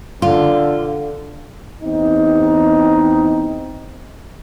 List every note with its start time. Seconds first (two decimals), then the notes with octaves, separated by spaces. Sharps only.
0.22 D3 F4
1.82 E2 C4 D#4